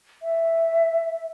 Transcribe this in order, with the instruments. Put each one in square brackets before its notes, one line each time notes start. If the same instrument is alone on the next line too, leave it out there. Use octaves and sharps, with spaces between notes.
[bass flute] E5